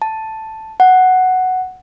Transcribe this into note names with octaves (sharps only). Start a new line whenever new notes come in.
A5
F#5